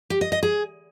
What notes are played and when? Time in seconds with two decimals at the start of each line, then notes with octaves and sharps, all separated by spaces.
0.10 G4
0.21 D#5
0.32 D#5
0.43 G#4